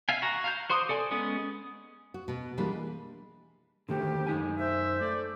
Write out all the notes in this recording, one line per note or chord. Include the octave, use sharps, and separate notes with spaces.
E5 F5 G#5
F#4 A#5
F5 A#5 G6
F#4 C5 C6 D6 D#6
A4 D5 G#5
G#3 B3 C#4 G#4
F#4
B2 B3
E3 G3 G#3 A#3 D4
D3 D#3 A3 G4
F#2 D#4 G#5
C5 E5
A3 D5